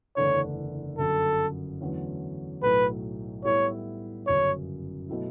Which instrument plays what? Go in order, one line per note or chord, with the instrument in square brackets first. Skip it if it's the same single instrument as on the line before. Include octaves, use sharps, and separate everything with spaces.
[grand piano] F#1 E2 D3 A3 D4 [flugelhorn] C#5
[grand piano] G1 F#2 D3 [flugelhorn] A4
[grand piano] E2 D3 F#3 A3 C#4
[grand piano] B1 A2 F#3 A3 [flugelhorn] B4
[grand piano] A2 G3 B3 E4 [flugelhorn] C#5
[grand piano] G1 F#2 C#3 [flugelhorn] C#5
[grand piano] B2 F#3 A3 E4